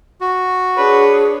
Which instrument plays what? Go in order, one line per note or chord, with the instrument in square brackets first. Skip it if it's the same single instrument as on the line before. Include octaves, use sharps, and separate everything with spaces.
[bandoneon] F#4
[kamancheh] D4 C#5 [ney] G#4 [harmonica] B4